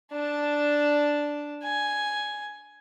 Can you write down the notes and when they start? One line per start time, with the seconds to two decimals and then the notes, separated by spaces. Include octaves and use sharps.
0.12 D4 A5
1.64 G#5